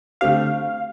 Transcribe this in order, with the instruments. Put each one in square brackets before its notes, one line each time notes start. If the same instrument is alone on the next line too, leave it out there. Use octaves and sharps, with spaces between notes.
[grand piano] D3 A3 C4 G4 [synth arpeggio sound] F5